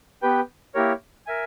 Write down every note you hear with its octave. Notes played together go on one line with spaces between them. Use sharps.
B3 G4 B4 G5
A#3 E4 G4 A#4 C#5
A#4 E5 G#5